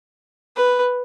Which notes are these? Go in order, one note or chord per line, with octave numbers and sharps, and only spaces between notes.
B4